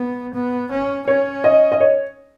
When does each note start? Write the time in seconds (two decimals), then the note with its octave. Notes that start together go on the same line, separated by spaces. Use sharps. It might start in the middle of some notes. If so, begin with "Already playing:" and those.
Already playing: B3
0.34 B3
0.71 C#4
1.07 C#4 C#5
1.44 D#5
1.72 D#5
1.80 C#5